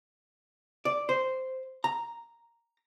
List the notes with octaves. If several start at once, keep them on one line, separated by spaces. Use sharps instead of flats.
D5
C5
A#5